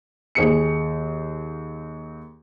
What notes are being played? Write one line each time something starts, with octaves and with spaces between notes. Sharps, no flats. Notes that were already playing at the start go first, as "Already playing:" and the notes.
D#2 G#4 C#7